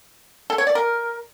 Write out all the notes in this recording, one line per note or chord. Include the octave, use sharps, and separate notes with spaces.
A4
C#5
D5
A#4